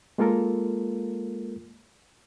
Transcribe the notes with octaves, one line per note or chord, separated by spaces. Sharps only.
G#3 A#3 F4 A4 A#4